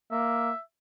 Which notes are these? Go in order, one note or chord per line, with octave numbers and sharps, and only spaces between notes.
A#3 E5